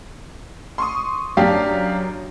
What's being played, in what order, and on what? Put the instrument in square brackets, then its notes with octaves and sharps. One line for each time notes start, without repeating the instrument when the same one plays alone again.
[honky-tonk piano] C6 C#6 D#6
[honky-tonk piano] F#2 [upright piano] D4 G4 F5